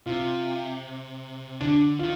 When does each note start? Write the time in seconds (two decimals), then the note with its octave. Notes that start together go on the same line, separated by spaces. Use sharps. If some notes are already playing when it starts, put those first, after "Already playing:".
0.06 C3 F4
1.60 D3 D4
1.99 D#3 F4